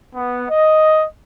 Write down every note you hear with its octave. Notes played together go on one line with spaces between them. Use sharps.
B3
D#5